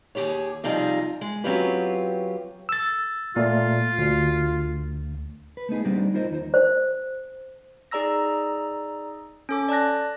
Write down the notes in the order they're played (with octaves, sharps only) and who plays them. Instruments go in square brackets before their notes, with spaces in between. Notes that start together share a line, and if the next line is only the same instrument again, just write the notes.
[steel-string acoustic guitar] D#2 A#2 G4 G#4 C#5
C3 F3 G3 D#4 F4 G#4
G#3
F#3 C4 C#4 F4 G4 B4
[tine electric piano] E6 A6
[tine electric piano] A#2 A3 [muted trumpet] F4
[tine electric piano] D2
[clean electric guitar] B4
A3 B3 D#4 G#4
G3 A#3 C4 D4 D#4 G4
D#4 F4 A#4 C5 D5 D#5
D#2 D#4 C5
[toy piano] C5
[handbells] D#4 G#4 D5 A#5 E6 A#6
C#4 A4 D6
D5 A5 F#6 A#6